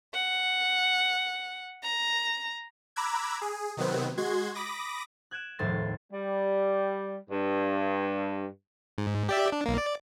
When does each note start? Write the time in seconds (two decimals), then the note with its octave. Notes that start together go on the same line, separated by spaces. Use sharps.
0.14 F#5
1.83 A#5
2.96 A#5 B5 D6 E6 F#6 G#6
3.42 G#4
3.77 C3 D#3 F#3 B3 C4
4.17 G#3 F#4 C6 G#6
4.55 B5 D6 D#6 A#6
5.31 F#6 G#6 D7 E7
5.59 F1 D#2 A2 G#3 C6 A6
6.13 G3
7.30 G2
8.98 G#2
9.29 G4 D5 E5
9.52 D4
9.66 B1 A#3
9.78 D5